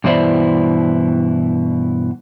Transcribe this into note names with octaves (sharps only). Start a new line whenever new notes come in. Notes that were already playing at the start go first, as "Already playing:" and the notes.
G2 B2 E3 E4 C5 D5